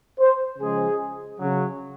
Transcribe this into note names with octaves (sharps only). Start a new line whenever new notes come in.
C5
C#3 F3 G#3 G#4
C#3 F#3